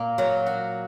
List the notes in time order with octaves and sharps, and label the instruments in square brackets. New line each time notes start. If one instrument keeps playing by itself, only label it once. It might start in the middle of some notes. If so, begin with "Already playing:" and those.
Already playing: [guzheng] A#2 A#3
[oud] F#3 [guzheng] A#4
[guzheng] F#4